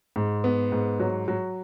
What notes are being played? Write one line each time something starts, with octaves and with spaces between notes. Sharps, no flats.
G#2
B3
G#2
F#3
F#3